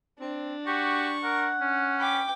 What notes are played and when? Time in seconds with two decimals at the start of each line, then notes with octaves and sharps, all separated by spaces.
0.20 C4 D4
0.67 F#4 G4 C#6
1.24 A#4 F#5
1.61 C#4
1.99 G5 B5 D6